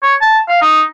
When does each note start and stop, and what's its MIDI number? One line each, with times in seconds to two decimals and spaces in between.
0.03 0.15 73
0.21 0.39 81
0.48 0.60 77
0.61 0.82 63